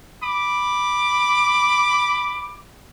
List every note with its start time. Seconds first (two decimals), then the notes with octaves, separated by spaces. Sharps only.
0.23 B5 D6